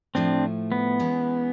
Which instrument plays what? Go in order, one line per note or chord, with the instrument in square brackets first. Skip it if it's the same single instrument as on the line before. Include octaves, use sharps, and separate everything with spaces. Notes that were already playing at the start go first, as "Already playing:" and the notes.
[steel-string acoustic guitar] A2 F3 A3 [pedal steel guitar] C4 D4
[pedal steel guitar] B3
[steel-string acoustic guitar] E3 G#3 C#4